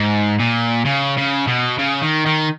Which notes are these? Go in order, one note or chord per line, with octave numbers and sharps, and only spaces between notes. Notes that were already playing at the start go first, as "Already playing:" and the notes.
Already playing: G#2
A#2
C#3
C#3
B2
C#3
D#3
D#3